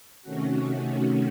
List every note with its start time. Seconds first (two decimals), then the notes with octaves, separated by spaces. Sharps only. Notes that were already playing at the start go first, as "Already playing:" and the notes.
0.22 C3 D#3 A3 C#4 F#4